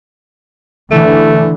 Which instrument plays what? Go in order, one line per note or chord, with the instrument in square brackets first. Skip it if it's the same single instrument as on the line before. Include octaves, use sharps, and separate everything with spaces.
[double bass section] D3 E3 [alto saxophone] A3